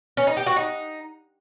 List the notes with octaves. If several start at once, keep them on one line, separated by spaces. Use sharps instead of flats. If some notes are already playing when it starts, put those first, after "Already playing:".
C#4
D#4
G4
F#4
D#4